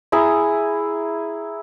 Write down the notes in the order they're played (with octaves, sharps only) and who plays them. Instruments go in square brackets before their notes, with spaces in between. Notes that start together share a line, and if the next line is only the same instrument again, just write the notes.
[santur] E4 G#4 A#5